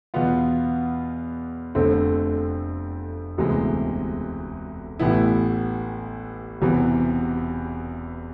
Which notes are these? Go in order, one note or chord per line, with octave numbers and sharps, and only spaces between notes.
E2 B2 B3 F4
F1 F2 D3 A3 C4
E1 D2 C3 E3 G#3
A1 A2 E3 B3 E4
E1 E2 C3 E3